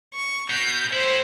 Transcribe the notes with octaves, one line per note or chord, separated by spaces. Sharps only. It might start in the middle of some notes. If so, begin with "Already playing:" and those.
C#6
B2 G6
A2 E4 C5